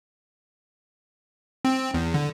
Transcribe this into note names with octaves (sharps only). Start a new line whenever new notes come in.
C4
E2
D3